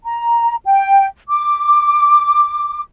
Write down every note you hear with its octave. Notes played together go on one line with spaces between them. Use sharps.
A#5
G5
D6